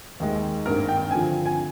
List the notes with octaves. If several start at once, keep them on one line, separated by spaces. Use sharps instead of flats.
D#2 D#3 G#3
G#1 G2 D#3 A#3 A#4
G5
G2 D3 F3 G#5
G#5